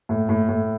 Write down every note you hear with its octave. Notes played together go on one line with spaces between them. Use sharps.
A2
A2
A2